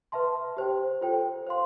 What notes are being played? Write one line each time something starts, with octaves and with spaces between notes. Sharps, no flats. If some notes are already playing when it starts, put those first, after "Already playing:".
B4 E5 A5 C6
G4 C5 G5
F4 A4 C5 G5
C5 F5 C6